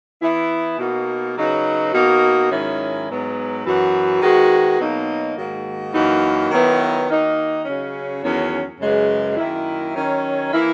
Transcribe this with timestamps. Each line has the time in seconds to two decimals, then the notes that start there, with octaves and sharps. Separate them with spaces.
0.22 E3 B3 E4
0.78 B2 A#3 D#4 F#4
1.36 C#3 F#3 B3 D#4 F#4
1.92 B2 A#3 D#4 F#4
2.50 G#2 D#3 F#3 C#4 E4
3.08 G#2 F#3 B3
3.64 F#2 E3 B3 F#4
4.21 D#3 G#3 B3 F#4
4.79 B2 F#3 A#3 D#4
5.36 G#2 D#3 A#3 D#4 F#4
5.93 F#2 E3 A#3 D#4 F#4
6.50 D#3 F#3 B3 E4
7.07 D#3 A#3 D#4 F#4
7.64 C#3 F#3 C#4
8.21 E2 D#3 F#3 C#4
8.79 F#2 C#3 E3 G#3
9.36 F#2 D#3 A#3 E4
9.94 D#3 F#3 C#4
10.51 E3 A#3 E4